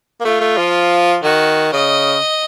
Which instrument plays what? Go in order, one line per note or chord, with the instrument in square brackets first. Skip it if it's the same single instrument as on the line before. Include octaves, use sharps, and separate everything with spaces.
[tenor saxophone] A#3
[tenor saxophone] A3 [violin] F4
[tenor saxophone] A3
F3
[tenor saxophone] D#3 [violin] F#4
[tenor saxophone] C#3 [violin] D#5